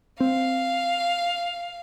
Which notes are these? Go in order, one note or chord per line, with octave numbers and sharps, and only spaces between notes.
C4 F5